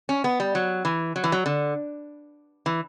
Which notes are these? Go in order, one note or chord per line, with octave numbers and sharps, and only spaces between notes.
C#4
B3
G3
F#3
E3
F#3
E3
F#3
D3
E3